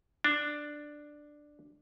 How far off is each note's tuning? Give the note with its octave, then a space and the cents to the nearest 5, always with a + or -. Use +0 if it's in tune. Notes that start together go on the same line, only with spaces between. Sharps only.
D4 +5